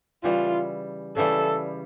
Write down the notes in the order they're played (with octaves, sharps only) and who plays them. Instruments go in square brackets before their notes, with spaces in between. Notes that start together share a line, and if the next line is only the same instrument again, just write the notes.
[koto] C#3 E3 G3 [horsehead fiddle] F4
[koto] C#3 E3 G3 [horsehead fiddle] A4